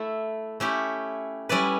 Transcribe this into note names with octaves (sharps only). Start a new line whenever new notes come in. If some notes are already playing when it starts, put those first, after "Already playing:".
Already playing: A3 E4 A4 E5
A3 C#4 E4 G4
G3 C#4 E4 B4 D5